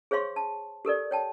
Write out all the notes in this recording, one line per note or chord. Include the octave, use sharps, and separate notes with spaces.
G#4 C5 C#5 F5 C6 C#6
A5
G4 A4 A#4 D5
C#5 G5 A5